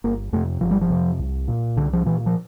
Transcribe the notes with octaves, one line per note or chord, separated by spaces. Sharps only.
G1 A#3
F2 C3 A3
G1 F3
G3
F3
F2 C3
C2
A#2
C2 D3
F3
A#2 E3
F3